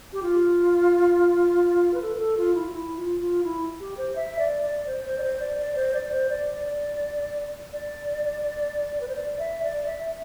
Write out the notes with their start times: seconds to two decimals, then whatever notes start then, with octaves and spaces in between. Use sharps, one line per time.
0.13 G4
0.23 F4
1.94 B4
2.02 A4
2.14 B4
2.19 A4
2.37 F4
2.54 E4
2.65 F4
2.72 E4
2.96 F4
3.20 F4
3.44 E4
3.80 G4
3.97 C5
4.16 E5
4.39 D5
4.63 D5
4.87 C5
5.05 C5
5.18 D5
5.23 C5
5.40 D5
5.58 D5
5.75 C5
5.94 D5
6.12 C5
6.30 D5
6.65 D5
7.73 D5
9.01 B4
9.08 C5
9.16 D5
9.39 E5
9.63 D5
9.86 E5